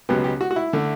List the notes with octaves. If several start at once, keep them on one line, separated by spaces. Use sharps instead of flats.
C#2 B2 F#3 B3 G4
G4
F#4
F#4
E4
D3 A3